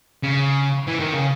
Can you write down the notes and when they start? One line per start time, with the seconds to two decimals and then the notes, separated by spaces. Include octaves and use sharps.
0.23 C#3
0.88 E3
1.00 D#3
1.13 C#3